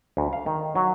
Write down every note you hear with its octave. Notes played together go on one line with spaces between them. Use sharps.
D2
F5
D#3
F#3